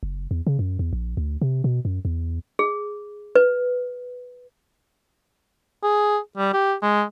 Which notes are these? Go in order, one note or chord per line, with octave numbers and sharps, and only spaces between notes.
F#1
E2
C#3
F#2
E2
A#1
D2
C3
B2
F#2
E2
G#4
B4
G#4
G3
G4
G#3